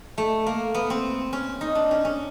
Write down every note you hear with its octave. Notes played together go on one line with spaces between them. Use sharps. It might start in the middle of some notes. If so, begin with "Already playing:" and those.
A3
A#3
B3
C4
C#4
D#4
D4
C#4
C#4